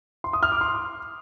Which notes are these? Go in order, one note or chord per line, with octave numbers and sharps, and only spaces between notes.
C6
D#6
F6
D6
C6